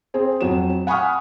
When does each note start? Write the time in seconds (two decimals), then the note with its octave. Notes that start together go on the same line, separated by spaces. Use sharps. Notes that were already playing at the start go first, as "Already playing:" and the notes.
0.14 C4 G#4 C5
0.41 F2 F#3 E7
0.87 F#5 G#5 B5 C#6 D#6 F6